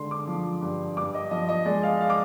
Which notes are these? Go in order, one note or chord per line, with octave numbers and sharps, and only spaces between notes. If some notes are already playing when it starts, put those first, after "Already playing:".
Already playing: D3 G#3 C6
D6
F3
G2
G2 D6
D#5
F3 D#5
D#5
G#3 D5
F5
F5
D6